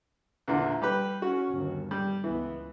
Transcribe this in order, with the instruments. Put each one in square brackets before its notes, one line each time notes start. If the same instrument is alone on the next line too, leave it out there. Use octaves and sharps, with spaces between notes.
[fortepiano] E2 A#2 D3
G3 G4 B4
[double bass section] C#4 [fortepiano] F#4
[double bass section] G1 D#2
[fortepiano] G3
[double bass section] C#2 B3 [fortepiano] E3